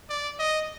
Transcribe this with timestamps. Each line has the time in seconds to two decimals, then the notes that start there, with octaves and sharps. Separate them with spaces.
0.10 D5
0.39 D#5